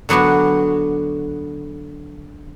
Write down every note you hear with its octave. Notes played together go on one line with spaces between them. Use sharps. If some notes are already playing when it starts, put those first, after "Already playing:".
D3 F#3 B3 D4 F#4